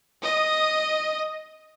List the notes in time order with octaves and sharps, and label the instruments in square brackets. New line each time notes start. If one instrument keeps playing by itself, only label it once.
[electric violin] D#5 D#6